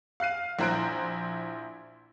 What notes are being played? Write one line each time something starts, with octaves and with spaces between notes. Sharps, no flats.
F5 F#6 C7 D#7
A#1 E4 C5 A#5 F#6 D7